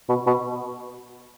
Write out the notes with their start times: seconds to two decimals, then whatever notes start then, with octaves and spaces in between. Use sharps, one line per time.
0.09 B2
0.27 B2